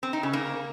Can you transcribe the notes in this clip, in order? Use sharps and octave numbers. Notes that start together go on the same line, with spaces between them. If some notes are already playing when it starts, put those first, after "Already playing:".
C4
D#4
C#3
A#3